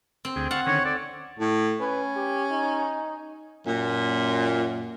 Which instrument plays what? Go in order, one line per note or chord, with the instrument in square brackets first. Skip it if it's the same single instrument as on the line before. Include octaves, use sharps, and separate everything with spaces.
[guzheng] C4
[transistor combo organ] D2 G#4 G5
[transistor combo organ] F5 A5 C#6 [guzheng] F#5
[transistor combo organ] D3 D#3 C#4 [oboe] C#5
[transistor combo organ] A4 [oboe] D5
[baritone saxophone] A2
[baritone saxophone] C#4 [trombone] B4
[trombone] G4
D#4
[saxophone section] F#2 A#2